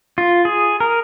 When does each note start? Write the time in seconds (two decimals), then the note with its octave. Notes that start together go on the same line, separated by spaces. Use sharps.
0.18 F4
0.45 G#4
0.80 A#4